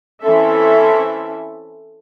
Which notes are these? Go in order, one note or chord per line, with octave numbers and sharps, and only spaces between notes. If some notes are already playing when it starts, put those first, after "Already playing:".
E3 C4 C#4 A4 E5